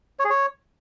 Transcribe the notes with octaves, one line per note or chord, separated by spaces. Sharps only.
C#5
G#4
C#5